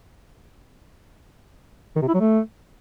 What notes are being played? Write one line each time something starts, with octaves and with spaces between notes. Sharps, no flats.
D#3
C3
E4
F#3
A3